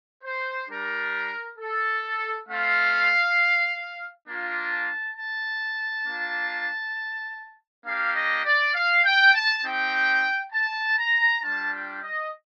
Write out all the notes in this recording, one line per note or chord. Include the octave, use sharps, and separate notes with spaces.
C5
G3 D4 G4 A#4
A4
A3 C4 F4 F5
A#3 D4 F4
A5
A5
A#3 D4 F4
A#3 D4 G4 F5
D#5
D5
F5
G5
A5
C4 D#4 G4 G5
A5
A#5
G3 D4 F4 A5
G5
D#5